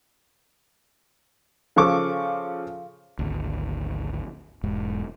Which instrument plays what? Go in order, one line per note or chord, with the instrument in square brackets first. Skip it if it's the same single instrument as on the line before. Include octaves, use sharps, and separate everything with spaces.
[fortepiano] C#3 F3 A4 C#6 D6
[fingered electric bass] G#1 D2
E1 G#2